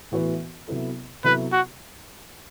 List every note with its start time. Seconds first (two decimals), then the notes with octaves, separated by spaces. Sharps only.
0.12 A2 E3 B3 F#4 B4
0.68 C3 F#3 B3 E4 A4
1.24 C3 F#3 B3 E4 A4 B4
1.52 F#4